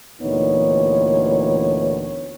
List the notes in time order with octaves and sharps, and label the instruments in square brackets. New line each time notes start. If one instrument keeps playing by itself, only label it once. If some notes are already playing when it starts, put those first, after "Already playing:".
[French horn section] D2 A#2 E3 B3 D#4 C#5